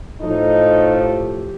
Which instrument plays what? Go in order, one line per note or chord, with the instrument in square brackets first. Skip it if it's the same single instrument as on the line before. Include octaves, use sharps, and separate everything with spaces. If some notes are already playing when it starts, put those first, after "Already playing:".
[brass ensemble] A2 F3 A3 D#4
G4